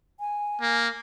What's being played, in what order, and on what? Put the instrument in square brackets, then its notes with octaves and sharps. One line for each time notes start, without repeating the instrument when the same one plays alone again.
[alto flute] G#5
[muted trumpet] A#3